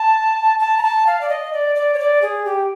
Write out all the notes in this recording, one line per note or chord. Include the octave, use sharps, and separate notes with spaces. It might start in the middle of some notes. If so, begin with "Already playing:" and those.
Already playing: A5
A5
A#5
A5
F5
D5
D#5
D5
D5
C#5
D5
G#4
G4